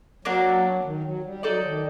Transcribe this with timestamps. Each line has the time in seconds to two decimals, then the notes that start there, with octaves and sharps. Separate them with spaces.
0.25 F#3 A#3 D4 F#4
0.84 D#3
1.04 F#3
1.24 G3
1.43 F#3 D#4 A4 D5
1.64 D#3